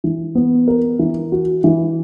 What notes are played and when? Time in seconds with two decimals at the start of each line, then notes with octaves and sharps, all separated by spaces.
0.04 E3
0.35 B3
0.68 A#4
0.99 E3
1.32 F#4
1.64 E3